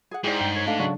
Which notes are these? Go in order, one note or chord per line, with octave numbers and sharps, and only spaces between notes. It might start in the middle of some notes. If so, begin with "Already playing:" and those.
G#4 F#5
G#2 E4 G4 G#4 D5
G2 G5
A#4 C#5
A3 D4 A4 F5
C#3 F#3 D4 F#4